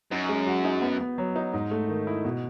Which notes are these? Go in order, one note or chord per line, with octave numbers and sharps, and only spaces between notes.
F#2 D#4
G#3
F#4
D#4
B3
B3
F#3
D#4
G#2
A3
D#3
E4
B2